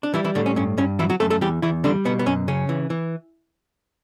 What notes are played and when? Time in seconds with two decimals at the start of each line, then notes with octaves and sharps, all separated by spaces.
0.03 D4
0.14 E3 G3 E4
0.24 E3 E4
0.35 A2 D3 D4
0.46 C#4
0.56 G2 C#4
0.78 G2 C#4
0.99 E3 F#3 E4
1.10 F#3 F#4
1.20 F#2 A3 A4
1.30 A3 A4
1.41 E2 G3 G4
1.62 E2 E3 E4
1.84 D3 G3 D4
2.05 B2 B3
2.19 B3
2.26 F#2 C#4
2.48 C#3 C#4
2.69 E3
2.90 E3